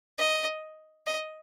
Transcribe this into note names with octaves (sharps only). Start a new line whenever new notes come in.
D#5
D#5